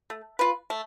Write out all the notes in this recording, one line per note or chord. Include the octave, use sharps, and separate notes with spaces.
A3
F4 B4
A3